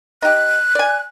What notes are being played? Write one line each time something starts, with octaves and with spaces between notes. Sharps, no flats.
D#4 G4 F#6
D5 G#5